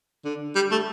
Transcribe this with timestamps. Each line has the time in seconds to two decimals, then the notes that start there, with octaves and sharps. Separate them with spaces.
0.25 D3
0.55 G3
0.71 A3